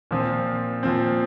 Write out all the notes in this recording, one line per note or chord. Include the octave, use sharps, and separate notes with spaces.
A#2 F3 C4
A#2 F3 C4